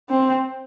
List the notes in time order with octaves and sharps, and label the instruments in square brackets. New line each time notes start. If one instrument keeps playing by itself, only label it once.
[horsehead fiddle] C4